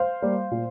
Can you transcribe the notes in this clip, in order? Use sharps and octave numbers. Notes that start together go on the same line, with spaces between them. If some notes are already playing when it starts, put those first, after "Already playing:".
Already playing: C5 F5
G3 A#3
A#2